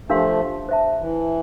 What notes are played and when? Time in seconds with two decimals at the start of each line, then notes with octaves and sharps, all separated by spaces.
0.09 F3 A3 D4 G4 A#4 F5 C6
0.69 C5 E5 A5
0.99 E3